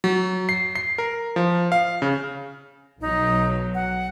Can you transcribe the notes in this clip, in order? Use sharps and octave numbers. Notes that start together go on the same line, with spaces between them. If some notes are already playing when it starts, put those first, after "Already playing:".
F#3
C7
C7
A#4
F3
F5
C#3
B1 F#3 D#4
F#5